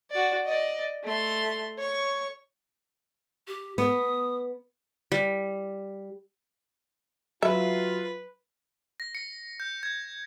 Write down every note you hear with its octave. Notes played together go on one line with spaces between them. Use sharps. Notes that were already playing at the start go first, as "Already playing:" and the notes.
F#4 D5
D5 D#5
A3 C6
C#5 C#6
G4
B3 D#6
G3
F#3 F4 B4 E5
A#6
C#7
G6
G#6